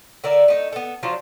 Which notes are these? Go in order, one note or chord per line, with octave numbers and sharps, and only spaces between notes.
D3 A#4 D5 E5
A3 D#4
B3 A4
F3 F#3 D4 F4